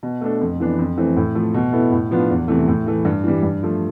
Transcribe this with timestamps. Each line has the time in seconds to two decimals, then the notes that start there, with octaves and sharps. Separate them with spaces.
0.03 B2
0.21 A3 D4 A4
0.41 F2
0.60 E3 B3 D4
0.78 F2
0.97 E3 A3 C4
1.16 A2
1.35 F3 A3
1.54 B2
1.72 B3 E4 A4
1.92 A2
2.11 F3 B3 D4 F4
2.30 E2
2.48 C3 E3 A3
2.68 A2
2.86 E3 A3
3.05 G2
3.24 E3 G3
3.43 G2
3.63 F3 A3